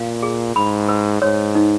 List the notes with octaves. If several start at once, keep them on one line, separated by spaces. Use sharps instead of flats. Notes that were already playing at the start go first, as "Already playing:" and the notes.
Already playing: A#2 F5
G#4
G#2 B5
B4
G#2 C#5
D#4